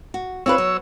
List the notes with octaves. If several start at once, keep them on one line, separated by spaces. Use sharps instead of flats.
F#4
C4 F4 B4 C#5 E6
F#3